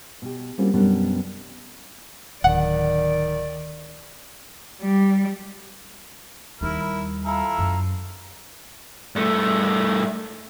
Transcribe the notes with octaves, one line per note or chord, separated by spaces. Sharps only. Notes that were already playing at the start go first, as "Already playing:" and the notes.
B2 G4
G3 A#3 C4 C#4 F4 F#4
F#2 B2 G3 B3 C#4 D4
D1 D#3 D5 F#5
G3
D#2 G3 E4 A#4
E4 F4 A4 A#5
F#2
G2 A3